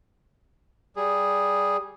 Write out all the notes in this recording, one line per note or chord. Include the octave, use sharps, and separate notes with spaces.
G3 G#4